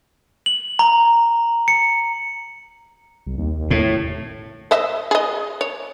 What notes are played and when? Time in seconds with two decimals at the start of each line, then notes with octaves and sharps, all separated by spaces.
0.46 F#7
0.79 A#5
1.68 C#7
3.26 C2
3.38 D#2
3.71 A2
4.71 C5 D#5 E5
5.11 G#4 D#5
5.61 C#5